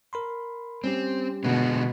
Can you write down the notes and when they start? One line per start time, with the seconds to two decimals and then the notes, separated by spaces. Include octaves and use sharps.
0.13 A#4 B5 C6
0.84 G3 C4 C#4 G4
1.44 B2 D3 G#3 B3